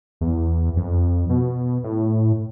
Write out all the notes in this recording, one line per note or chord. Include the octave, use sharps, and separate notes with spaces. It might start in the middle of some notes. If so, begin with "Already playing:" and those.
E2
F2
B2
A2